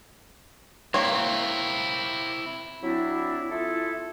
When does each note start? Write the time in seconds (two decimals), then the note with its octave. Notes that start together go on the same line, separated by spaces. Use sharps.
0.94 A#3 C4 E4 C#5
2.82 F#3 C4 D4 E4
3.50 E4 F4 G#4 A4 E5